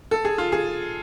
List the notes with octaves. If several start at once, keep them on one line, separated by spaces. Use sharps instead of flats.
A4
G#4
F4
G#4